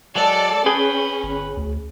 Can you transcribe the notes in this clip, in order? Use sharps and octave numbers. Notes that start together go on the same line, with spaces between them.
F#3 G#3 A4 D5
C#4 G#4 B4 G5
G1
D2